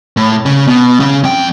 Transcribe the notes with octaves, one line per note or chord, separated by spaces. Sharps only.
A2
C#3
B2
C#3
F2 G5